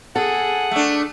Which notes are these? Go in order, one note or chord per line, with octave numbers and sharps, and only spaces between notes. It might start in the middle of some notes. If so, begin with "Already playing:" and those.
G#4 A4 F#5
A3 D4